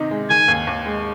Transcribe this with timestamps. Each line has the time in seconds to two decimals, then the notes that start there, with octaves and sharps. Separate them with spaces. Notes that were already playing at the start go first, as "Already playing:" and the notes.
Already playing: C3 D#3 D#4
0.11 G#3
0.30 D#3 G#5
0.48 D#2
0.67 D#2
0.86 G#3